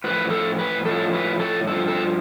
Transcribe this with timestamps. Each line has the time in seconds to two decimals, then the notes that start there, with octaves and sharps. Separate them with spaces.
0.04 A2 F3 B4
0.30 A4
0.59 B4
0.85 A2 F3 A4
1.13 B4
1.40 A4
1.67 G2 F3 A4
1.88 A4